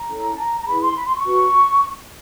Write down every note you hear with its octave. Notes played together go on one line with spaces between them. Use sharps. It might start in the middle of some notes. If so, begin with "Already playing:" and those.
Already playing: A#5
C#4 E4 A4
A5
A#5
A#5
E4 G#4 B4 B5
C6
B5
C6
C#6
C#4 F#4 B4